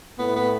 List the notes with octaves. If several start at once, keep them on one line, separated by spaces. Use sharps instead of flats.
A2 B3
B3